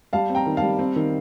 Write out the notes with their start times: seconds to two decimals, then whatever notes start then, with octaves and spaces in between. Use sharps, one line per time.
0.13 G3 F5 A5
0.29 C4
0.35 G5 A#5
0.46 D#3
0.57 F5 A5
0.62 G3
0.79 C4
0.96 D#3